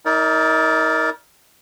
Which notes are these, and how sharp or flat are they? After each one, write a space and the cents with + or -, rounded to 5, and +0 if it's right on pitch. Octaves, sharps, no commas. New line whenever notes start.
D#4 +40 A#4 +0 D5 -10